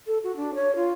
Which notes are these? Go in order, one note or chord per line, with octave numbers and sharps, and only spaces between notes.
A4
F#4
D4
C#5
F4